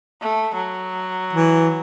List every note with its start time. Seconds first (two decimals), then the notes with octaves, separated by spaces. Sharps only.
0.22 A3
0.55 F#3
1.33 E3